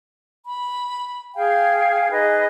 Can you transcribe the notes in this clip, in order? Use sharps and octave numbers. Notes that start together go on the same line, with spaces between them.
B5
G#4 F5 G5 G#5
D#4 G#4 B4 D#5